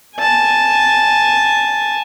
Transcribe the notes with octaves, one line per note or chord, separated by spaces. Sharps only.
G#5 A5